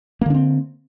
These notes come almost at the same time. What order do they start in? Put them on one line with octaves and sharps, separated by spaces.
A#3 D3 D4 C4